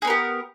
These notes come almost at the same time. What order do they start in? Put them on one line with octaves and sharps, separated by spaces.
G#4 B3 A#4 G4